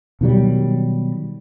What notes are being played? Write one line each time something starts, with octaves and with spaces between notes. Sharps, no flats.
B2 D#3 F#3 G3